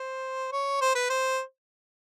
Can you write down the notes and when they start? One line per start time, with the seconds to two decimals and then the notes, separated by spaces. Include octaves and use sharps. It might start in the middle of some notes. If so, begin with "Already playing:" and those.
Already playing: C5
0.52 C#5
0.81 C5
0.95 B4
1.10 C5